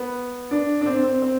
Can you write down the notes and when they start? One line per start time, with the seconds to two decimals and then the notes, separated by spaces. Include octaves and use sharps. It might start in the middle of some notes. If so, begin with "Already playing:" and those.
Already playing: B3
0.51 D4
0.81 D4
0.86 C4
1.03 C4
1.22 C4